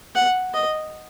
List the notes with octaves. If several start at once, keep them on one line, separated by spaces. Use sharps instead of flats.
F#5
D#5